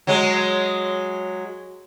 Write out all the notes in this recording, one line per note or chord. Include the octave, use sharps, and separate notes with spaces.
F#3 G#3